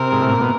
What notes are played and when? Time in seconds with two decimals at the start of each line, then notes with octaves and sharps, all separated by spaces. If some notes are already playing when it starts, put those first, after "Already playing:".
Already playing: C3 A#4
0.12 G#2
0.22 A2
0.31 A#2
0.41 B2